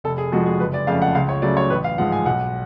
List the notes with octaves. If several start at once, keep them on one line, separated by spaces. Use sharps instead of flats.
F1 A4
G#4
F2 F3 G#3 F#4
G#4
F#1 B4
D5
F2 C#3 F3 A3 F5
F#5
C#2 F5
C#5
C#3 F#3 A3 D5
C#5
A1 B4
F5
G#2 F3 F#5
G#5
B1 F#5